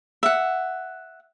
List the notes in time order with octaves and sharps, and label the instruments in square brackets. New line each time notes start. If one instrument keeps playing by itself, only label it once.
[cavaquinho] E5 F#5